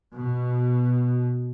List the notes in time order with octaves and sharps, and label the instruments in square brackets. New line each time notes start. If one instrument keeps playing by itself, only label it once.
[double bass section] B2